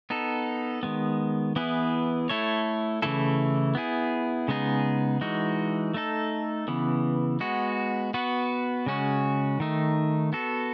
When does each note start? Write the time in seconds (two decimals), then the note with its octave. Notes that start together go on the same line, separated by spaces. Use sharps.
0.10 B3 D#4 A4
0.83 D#3 G#3 B3
1.56 E3 B3 E4 G#4 B4
2.29 A3 E4 A4 C#5
3.02 C#3 E3 A3 E4 A4
3.75 B3 E4 G#4
4.48 C#3 G#3 B3 D#4 G#4
5.21 E3 G#3 D#4 F#4
5.94 A3 D#4 A4
6.68 C#3 E3 B3
7.40 G#3 B3 F#4
8.14 B3 F#4 B4
8.86 C#3 G#3 C#4 F#4
9.60 D#3 A3 D#4
10.33 B3 F#4 A4